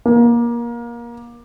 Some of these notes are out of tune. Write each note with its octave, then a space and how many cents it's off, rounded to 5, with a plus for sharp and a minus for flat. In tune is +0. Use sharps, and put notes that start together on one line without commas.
A#3 +25